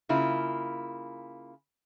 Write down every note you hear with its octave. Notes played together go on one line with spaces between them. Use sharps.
C#3 A#3 E4 F4